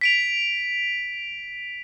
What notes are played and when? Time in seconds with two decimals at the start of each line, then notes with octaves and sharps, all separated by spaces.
0.01 B6 D7 F7